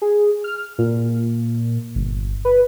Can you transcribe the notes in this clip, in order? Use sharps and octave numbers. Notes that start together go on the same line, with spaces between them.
G#4
F6
A#2
G1
B4